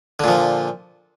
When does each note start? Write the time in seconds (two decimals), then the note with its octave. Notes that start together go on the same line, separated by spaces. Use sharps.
0.20 D3
0.24 A#2
0.28 F3